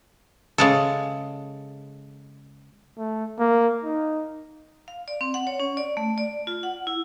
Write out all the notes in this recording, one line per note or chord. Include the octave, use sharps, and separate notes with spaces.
C#3 G#3 A4
A3
A#3
D#4
F5
D5
C4
F#5
C#5
C#4
D5
A3
D5
F4
F#5
E4